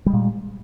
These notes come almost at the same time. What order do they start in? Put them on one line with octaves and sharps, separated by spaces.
G3 G#3 A#2